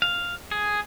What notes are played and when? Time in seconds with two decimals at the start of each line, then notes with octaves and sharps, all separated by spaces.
0.02 F5
0.51 G#4